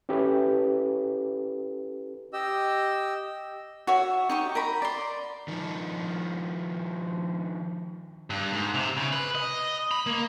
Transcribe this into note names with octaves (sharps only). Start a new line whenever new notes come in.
C#4 E4 G4 A4 B4
G4 D#5 E6
F#4 C#5 E5
D#4 G4 C#6
A#4 A#5 B5
D5 C6
D#3 F3
G2
G#2
C3
C#3
B4
D#5
B5
A#3